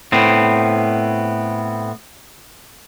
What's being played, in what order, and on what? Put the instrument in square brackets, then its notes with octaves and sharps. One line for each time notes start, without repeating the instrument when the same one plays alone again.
[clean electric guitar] A2 B3 C4